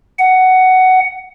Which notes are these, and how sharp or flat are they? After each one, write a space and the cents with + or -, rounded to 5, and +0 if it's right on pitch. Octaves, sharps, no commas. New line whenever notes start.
F#5 +10